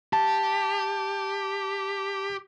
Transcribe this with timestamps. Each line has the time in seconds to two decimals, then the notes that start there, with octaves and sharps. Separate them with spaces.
0.13 G4 A5